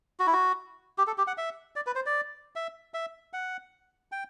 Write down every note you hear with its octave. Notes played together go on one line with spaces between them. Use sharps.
F#4
E4
F#4
G4
A4
G4
F#5
E5
D5
B4
C5
D5
E5
E5
F#5
G5